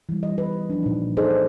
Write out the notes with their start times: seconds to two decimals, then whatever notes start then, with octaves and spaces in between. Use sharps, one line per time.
0.09 E3 G3
0.23 D#5
0.38 B4
0.70 F3 D4
0.83 A#2 D#4
1.17 D#4 G#4 A4 C5 D5 D#5